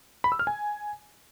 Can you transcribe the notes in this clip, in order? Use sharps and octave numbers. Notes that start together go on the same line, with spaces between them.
B5
E6
F6
G#5